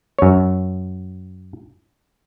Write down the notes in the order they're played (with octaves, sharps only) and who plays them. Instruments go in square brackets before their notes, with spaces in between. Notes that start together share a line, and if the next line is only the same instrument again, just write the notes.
[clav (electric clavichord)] F#2 C#5